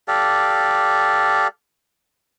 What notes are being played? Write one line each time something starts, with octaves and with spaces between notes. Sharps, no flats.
G4 A4 D5 F5